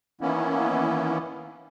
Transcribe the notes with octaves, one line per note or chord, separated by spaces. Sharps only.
D#3 E3 A#3 B3 C#4 E4